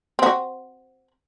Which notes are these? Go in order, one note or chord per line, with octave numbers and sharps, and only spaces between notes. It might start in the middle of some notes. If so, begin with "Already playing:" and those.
C4 F#4